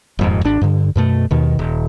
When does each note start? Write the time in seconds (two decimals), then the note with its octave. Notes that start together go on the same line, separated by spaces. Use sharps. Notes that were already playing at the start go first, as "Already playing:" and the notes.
0.19 D#1 F2 G#2
0.44 G#1 D4
0.61 G2 D3
0.96 F#2 B2 A3
1.31 D#2 B2 D#3
1.59 D#1